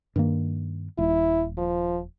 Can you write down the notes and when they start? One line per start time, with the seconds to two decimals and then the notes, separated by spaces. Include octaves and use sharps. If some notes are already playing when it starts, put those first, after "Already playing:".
0.16 G2 D#3 A#3
0.98 D#1 E4
1.58 F3